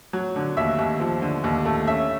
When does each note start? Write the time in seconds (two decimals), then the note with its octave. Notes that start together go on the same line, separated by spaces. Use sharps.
0.13 F#3
0.36 D3
0.57 D#2 E5
0.78 D#2
1.00 F3
1.22 D3
1.44 D#2
1.66 A3
1.87 C#4 E5